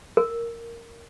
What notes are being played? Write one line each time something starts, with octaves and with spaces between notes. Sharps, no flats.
A#4